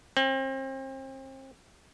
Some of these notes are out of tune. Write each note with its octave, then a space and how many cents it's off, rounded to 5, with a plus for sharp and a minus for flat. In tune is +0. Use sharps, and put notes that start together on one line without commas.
C4 +35